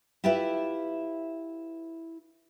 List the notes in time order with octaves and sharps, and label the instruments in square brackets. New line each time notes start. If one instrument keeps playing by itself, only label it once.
[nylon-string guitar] E4 F4 G4 B4 E5